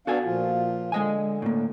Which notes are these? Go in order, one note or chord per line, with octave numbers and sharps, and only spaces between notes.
B3 D4 F#4 A4 F5 G#5
A#2 F3 F4
D3 G#3 D#5 G#5
A2 A#3